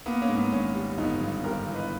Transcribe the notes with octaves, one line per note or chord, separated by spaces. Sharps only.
A#3 B3
A#3 C#4
G#2
B3
G#1 A#3 C#4
G3
G1 B3 D#4
G2
G1 G4 A#4
E3
B4 D#5